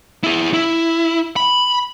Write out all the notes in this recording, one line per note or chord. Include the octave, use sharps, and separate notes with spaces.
E4 G#4
E4
B5